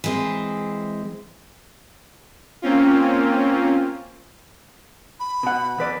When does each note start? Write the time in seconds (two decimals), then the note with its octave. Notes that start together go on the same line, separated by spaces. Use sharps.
0.04 E3 G#3 C4
2.62 A#3 C4 C#4 F4
5.20 B5
5.43 B2 F#5
5.78 E2 B4 D5